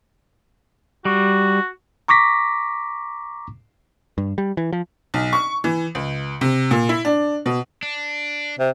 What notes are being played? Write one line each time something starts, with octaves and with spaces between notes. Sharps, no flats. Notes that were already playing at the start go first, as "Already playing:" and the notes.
G3 F#4
A#5 C#6 D6 A#6 B6
G2
G3
E3
F3
B1
C#6
E3
C#2
C3
A#2
E4
D4
B2
D4
C3